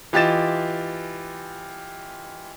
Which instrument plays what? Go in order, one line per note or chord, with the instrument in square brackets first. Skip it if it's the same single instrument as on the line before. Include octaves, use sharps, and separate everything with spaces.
[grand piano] E3 F4 G4 D#5 A6 E7